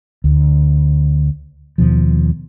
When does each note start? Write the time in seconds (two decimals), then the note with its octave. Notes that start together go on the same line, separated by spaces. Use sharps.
0.24 D2
1.78 D#2 B2 F3